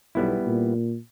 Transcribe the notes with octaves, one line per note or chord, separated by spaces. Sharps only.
B1 G3 B3 E4
A#2